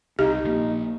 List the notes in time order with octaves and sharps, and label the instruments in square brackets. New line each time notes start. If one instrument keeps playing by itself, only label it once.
[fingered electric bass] C2 [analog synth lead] D#4 [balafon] G4
[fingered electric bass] A#1 F3 A#3